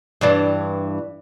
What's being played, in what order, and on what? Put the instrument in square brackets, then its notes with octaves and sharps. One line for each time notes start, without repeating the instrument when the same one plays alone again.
[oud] G2 E3 D4